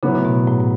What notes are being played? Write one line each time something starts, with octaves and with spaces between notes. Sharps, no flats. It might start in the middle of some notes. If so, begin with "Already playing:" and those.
A2 C#3 F#3 B3
C#3
B2
A2
A2